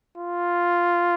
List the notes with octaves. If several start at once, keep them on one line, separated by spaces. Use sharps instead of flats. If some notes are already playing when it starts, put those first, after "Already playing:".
F4